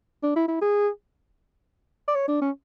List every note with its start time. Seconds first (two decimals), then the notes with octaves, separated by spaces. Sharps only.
0.23 D4
0.36 E4
0.48 E4
0.62 G#4
2.08 D5
2.15 C#5
2.28 D4
2.42 C#4